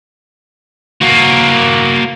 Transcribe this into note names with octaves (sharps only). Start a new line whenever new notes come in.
A#3 F#4